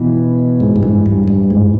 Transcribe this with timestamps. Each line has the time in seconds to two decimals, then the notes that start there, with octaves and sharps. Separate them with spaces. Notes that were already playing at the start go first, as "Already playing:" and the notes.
Already playing: B2 E3
0.60 G#2
0.76 G2
0.83 G#2
1.06 G2
1.28 G2
1.50 G#2